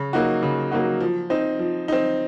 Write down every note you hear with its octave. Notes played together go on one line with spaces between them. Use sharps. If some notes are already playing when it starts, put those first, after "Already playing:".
Already playing: C#3
F#3 A#3 D#4 F#4
C#3
F#3 A#3 D#4 F#4
F3
C4 D#4
F3
C4 D#4